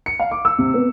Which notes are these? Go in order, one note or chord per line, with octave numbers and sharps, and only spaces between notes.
C#7
F5
D6
E6
C3
B3